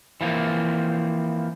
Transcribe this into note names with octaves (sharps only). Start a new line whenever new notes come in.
E3 F3 A#3 C4